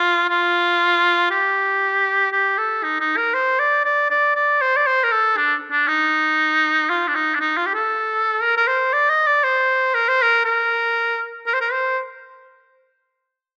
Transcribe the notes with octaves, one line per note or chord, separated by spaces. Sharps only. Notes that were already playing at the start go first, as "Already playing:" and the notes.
Already playing: F4
F4
G4
G4
A4
D#4
D#4
A#4
C5
D5
D5
D5
D5
C5
D5
C5
A#4
A4
D4
D4
D#4
F4
D4
D#4
D4
D#4
F4
G4
A4
A#4
A#4
C5
D5
D#5
D5
C5
A#4
C5
A#4
A#4
A#4
C5
A#4
C5